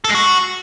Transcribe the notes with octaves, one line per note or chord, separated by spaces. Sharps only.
A4
G#3
F#4